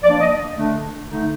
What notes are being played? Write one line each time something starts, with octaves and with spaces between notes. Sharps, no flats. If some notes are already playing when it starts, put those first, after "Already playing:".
F3 A#3 D4 D5
D#5
D3 A3 D4
D3 A3 D#4